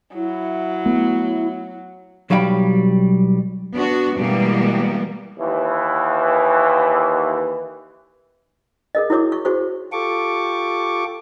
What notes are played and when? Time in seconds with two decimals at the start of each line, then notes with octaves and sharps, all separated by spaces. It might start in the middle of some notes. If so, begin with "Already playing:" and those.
0.14 F#3 E4
0.86 A3 B3
2.30 B1 F#3 G3 F5 G5 B5
3.74 B3 D4 F#4
4.17 B2 E3 G3 G#3 A#3 B3
5.38 D#2 E3
8.95 G#4 A#4 D#5
9.10 E4 F#4 A#4 C#5 D6
9.32 C#6
9.45 F#4 G#4 C5 C#6
9.92 F4 G4 A4 C#6 D6